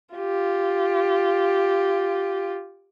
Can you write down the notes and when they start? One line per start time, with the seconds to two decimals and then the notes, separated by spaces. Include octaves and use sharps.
0.16 F4 G4